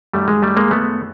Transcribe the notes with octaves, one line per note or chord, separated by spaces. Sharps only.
F#2 D#3 F#3 G3 A3
G#3
G3 A3
G#3 A#3
A3 B3